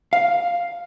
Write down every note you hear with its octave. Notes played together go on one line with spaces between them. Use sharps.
F5